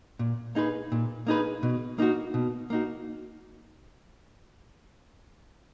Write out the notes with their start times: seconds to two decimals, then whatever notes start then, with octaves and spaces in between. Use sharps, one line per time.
0.19 A#2
0.55 A#3 D#4 G#4 B4
0.92 A#2
1.27 A#3 D#4 G#4 B4
1.63 B2
1.98 A#3 D#4 F#4
2.34 B2
2.70 A#3 D#4 F#4